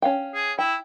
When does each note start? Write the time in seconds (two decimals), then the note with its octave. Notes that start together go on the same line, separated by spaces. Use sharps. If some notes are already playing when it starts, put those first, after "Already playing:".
0.02 C#4 F5 G5
0.34 G#4
0.58 E4 G5